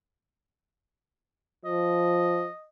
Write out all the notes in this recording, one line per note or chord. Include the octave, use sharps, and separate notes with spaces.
F3 D#5